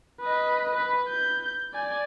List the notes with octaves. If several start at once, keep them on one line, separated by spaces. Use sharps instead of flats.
B4 D#5
B4
G6
D5 G#5